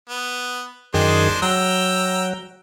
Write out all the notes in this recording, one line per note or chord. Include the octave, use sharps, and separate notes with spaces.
B3
F#2 D#3 G#3 D4 G#4 C5
F#3 G5 A#5 E6